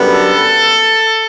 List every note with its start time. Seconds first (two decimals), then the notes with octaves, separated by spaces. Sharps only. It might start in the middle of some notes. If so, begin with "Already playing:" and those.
Already playing: F#2 D3 G3 B3
0.14 A4